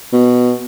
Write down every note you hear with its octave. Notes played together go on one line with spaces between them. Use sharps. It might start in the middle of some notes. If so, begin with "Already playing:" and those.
B2